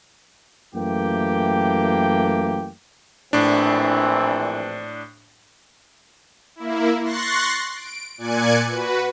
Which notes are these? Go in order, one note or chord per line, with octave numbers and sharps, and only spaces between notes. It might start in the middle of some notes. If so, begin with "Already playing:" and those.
F#2 E3 A3 A#3 G4 G5
A#1 A2 E3 C4 D4
A#3 E4
C6 C#6 F#6 A6 A#6 C7
D7
A#2 D5 G#5 F#6 G#6 C#7
F#4 B4